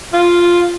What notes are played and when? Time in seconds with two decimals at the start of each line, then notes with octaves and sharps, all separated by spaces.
0.13 F4